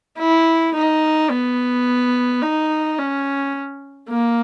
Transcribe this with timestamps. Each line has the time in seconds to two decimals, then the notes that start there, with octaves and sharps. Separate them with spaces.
0.19 E4
0.75 D#4
1.30 B3
2.42 D#4
2.98 C#4
4.09 A#3